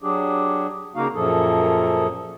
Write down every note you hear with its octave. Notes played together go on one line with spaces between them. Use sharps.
F#3 D4 G4 G#4
C#3 A#3 D#4 F#4 F5
F#2 A#2 F3 G#4 A4